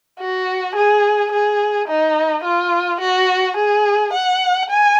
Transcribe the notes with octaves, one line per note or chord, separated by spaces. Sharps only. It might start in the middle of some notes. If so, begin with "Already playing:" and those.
F#4
G#4
G#4
D#4
F4
F#4
G#4
F#5
G#5